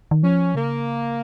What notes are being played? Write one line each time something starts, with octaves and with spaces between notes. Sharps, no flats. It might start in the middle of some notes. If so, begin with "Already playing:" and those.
D#3
F3 C#4
C#3 A#3